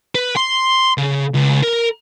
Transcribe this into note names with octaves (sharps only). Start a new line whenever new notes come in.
B4
C6
C#3
C#2
A#4